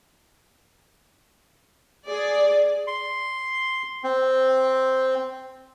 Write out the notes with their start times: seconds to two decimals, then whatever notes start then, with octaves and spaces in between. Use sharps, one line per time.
2.07 G#4 D5
2.87 C6
4.04 C4